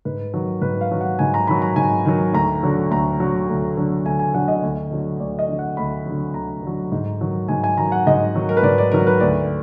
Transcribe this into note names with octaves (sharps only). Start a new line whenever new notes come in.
G#2 B4
D#3 F#3
G#2 B4
F5
D#3 F#3
F#5
G#2 G#5
A#5
D#3 F#3 B5
A#5
G#2 G#5
D#3 F#3
D2 A#5
D3 F#3
D2 A#5
D3 F#3
D2
D3 F#3
D2 G#5
G#5
D3 F#3 F#5
D#5
D2
D3 F#3
D2 D5
D#5
D3 F#3
F#5
D2 B5
D3 F#3
D2 A#5
D3 F#3
G#2
D#3 F#3
G#2 G#5
G#5
D#3 F#3 A#5
F#5
G#2 D#5
D#3 F#3
A#4
B4
G#2 D5
D5
D#3 F#3 A#4
B4
D2 D5